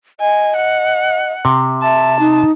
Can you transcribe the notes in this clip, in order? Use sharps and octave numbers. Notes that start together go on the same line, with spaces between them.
D#5 G#5
F#5
C3
E5 A5
D#4